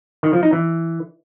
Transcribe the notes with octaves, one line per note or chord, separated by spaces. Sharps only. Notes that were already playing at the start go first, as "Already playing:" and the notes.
D#3
F3
D#4
E3